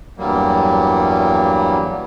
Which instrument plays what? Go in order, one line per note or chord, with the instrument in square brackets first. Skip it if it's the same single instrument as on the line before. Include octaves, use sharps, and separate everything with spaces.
[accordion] E2 G2 F#3 G3 A#3